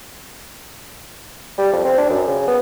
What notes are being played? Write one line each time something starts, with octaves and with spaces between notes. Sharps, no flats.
G3
F2
C4
D4
F#2
C#3
B3